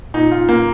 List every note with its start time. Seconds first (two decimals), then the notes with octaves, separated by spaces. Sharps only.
0.14 A#2 D#4
0.31 F4
0.49 A#2 A#3